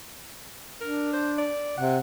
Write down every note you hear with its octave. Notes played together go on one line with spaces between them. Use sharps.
D4 A#4
C5
D5
C3 F#5